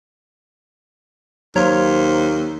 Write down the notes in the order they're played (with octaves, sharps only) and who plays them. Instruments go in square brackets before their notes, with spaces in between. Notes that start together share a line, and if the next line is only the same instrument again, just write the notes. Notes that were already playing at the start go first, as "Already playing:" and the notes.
[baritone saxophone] D#2 [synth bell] F#3 C#5 A#5 [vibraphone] C5 F5 C6